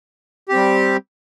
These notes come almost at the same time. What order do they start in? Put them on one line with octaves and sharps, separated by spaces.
G4 C4 G3